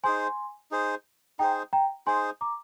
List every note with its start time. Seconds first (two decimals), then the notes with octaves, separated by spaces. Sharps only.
0.04 D#4 G#4 C5 G#5 C6
0.71 D#4 G#4 C5
1.39 D#4 G#4 C5 G5 A#5
1.73 G5 A#5
2.07 D#4 G#4 C5 G#5 C6
2.41 A#5 D6